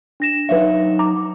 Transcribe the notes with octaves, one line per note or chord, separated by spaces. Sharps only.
D4 A#6 E7
F#3 D#4 B4 C#5 E5 F5
A#5 D6